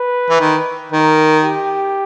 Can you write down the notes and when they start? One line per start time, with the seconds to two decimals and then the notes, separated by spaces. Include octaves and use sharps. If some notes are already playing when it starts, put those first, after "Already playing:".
Already playing: B4
0.30 E3
0.41 D#3
0.92 D#3 A#4
1.44 G4